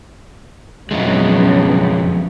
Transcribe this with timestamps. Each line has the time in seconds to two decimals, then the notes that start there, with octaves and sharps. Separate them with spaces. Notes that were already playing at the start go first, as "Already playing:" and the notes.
0.91 F2 C#3 F#3 G#3 B3